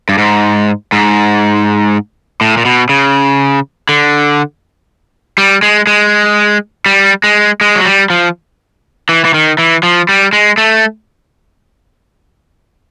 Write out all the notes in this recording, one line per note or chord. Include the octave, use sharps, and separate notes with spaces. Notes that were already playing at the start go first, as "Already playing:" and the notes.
G2
G#2
G#2
A2
A#2
B2
C#3
D3
G3
G#3
G#3
G3
G#3
G#3
F#3
G3
F3
E3
E3
D#3
E3
F3
G3
G#3
A3